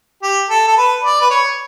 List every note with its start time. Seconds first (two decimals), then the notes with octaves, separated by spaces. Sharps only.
0.23 G4
0.50 A4
0.68 A4
0.77 B4
1.04 D5
1.21 B4
1.30 C#5